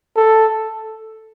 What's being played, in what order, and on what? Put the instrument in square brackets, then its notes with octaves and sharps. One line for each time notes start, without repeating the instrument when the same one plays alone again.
[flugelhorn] A4